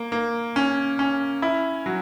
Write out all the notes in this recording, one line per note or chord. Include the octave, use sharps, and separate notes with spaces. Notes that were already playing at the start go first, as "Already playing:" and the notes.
Already playing: A#3
A#3
C#4
C#4
E4
F#3